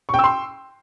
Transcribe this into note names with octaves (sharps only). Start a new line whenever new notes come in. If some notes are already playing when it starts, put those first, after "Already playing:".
G5 C6 C#6 E6